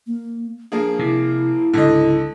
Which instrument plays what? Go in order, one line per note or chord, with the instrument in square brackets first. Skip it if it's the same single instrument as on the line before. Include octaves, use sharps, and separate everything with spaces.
[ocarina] A#3
[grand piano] F3 A#3 G#4 [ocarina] D4
[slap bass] C3 [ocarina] E4
[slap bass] C#2 G#2 [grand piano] D3 D#5